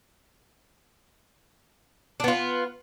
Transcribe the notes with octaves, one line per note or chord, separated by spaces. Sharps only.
B3 D4 F4